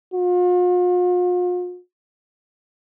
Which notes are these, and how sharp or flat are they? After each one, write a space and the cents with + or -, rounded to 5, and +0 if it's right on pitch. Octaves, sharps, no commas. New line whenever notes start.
F4 +45